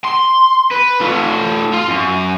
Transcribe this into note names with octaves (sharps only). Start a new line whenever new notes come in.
C6
B4
A3 F4
F4 F5
F#2